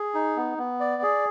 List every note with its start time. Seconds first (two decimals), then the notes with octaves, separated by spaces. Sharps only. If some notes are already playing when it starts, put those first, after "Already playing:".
Already playing: G#4
0.14 D#4
0.37 B3
0.58 B3
0.80 D5
1.02 G#4